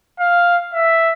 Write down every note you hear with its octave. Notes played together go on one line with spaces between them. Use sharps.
F5
E5